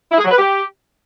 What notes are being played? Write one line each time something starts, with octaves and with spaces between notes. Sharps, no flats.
E4
G#4
F#3
B4
G4